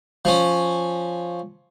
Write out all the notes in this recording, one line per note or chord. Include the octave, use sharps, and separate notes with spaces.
F3 C#4